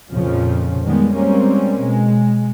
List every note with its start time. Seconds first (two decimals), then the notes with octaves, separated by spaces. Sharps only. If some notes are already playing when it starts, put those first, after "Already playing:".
0.11 F2 A#2 C#3 F3 C#4
0.84 D#3 G3 G#3 B3
1.14 G3 G#3 A#3 C4 C#4
1.80 B2 G#3